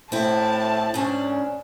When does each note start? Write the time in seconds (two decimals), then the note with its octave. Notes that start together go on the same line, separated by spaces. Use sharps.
0.12 A2 C4 E4 A5
0.94 G#2 C#4 D4